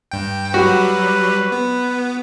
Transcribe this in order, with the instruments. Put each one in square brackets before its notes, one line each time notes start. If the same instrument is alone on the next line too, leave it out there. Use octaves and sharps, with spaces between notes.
[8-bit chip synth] G2 G5
[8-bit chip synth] F#3 G3 [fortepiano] F#4 [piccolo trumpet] B4
[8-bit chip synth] B3